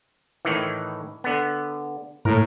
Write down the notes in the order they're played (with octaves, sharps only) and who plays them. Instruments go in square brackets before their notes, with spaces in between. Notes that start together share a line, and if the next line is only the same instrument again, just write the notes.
[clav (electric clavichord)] A2 D#3 E3
D3 B3
[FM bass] A2 [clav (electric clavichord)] A#4